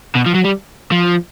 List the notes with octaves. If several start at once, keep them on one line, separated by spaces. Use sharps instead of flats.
B2
F3
F#3
G3
F3